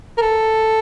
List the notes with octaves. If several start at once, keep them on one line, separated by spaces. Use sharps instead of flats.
A#4
A4